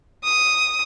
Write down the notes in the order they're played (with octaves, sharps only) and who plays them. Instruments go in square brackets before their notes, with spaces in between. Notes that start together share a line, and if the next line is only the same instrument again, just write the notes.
[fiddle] D#6